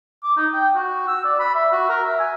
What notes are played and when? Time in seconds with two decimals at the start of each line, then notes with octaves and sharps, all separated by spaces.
0.24 D6
0.37 D#4
0.53 G5
0.75 F#4
1.08 E6
1.25 D5
1.39 B5
1.55 E5
1.72 F#4
1.89 A#4
2.04 E5
2.20 G#5